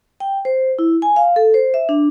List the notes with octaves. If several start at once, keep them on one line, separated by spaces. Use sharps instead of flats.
G5
C5
E4
G#5
F5
A4
C5
E5
D4